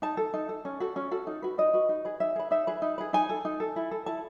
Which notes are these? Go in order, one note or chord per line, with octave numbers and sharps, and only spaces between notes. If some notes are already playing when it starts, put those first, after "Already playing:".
D#4 A5
A4
D#4
A4
C#4
F#4 A4
C#4
F#4 A4
D#4
F#4 B4
D#4 D#5
F#4 B4
D#4
G#4 B4
D#4 E5
G#4 B4
D#4 E5
G#4 B4
D#4
G#4 B4
D#4 G#5
A4
D#4
A4
E4
A4
E4 A5